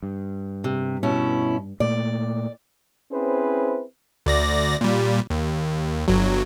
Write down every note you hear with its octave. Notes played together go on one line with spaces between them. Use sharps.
G2
C3
B2 C#4 E4
A#2 A3 D5
C4 C#4 E4 G#4 B4 C5
D2 D5 A#6
A#2 G3
D#2
G1 F#3